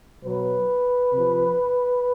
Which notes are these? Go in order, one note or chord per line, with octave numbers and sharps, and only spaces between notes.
B2 F#3 B4
C3 F3